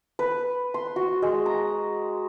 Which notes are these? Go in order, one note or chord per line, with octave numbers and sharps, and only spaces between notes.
B4
C6
F#4
G#3
A#5